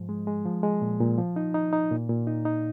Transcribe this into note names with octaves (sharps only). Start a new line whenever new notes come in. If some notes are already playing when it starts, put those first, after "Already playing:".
Already playing: G#2 F3
G#3
G#3
F3
G#3
A#2
A#2
F3
D#4
D#4
D#4
A#2
A#2
D#4
D#4